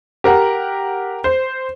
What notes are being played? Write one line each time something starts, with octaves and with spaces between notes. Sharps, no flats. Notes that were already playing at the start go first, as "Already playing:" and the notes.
G4 A#4 F#5
C5